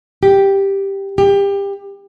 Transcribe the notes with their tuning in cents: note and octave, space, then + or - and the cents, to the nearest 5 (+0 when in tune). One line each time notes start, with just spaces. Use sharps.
G4 +0
G4 +25